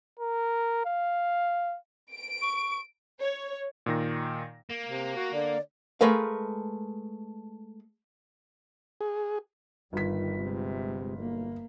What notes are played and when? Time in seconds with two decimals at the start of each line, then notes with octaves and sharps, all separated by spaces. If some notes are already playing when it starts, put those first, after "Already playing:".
0.19 A#4
0.86 F5
2.12 D7
2.42 C#6
3.20 C#5
3.86 A#2 D#3 A#6
4.71 A#3
4.88 C3
5.16 F#4
5.33 D3 D5
6.01 G#3 A3 A#4 B4 F5
9.01 G#4
9.93 G1 D#3 G3 F4 B6
10.39 C3 G#3
11.18 B1 A#3